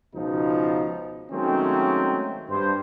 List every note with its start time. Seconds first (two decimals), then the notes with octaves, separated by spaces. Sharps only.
0.15 C#2 B2 F3 D#4
1.31 D#3 F#3 G#3 A3 C4 C#4
2.49 G2 C5